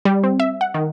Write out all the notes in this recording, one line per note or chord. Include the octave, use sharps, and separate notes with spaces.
G3
C4
E5
F#5
D#3